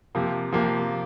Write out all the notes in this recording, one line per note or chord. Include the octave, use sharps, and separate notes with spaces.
C3 F3 A#3
C3 F3 A#3